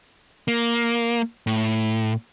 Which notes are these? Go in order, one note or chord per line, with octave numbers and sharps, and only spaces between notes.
A#3
A2